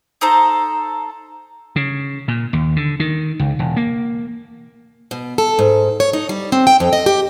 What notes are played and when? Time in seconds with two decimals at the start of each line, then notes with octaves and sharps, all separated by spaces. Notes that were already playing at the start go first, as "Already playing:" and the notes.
0.21 D#4 A4 C5 A#5
1.76 C#3
2.28 A#2
2.53 D#2
2.76 D3
3.00 D#3
3.40 C#2
3.59 E1
3.77 A#3
5.11 B2
5.38 A4
5.59 G#2
6.00 C#5
6.13 D#4
6.29 G3
6.52 C4
6.67 G5
6.80 F2
6.93 D#5
7.06 G4